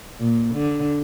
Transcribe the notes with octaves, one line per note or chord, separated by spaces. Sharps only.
A#2
D3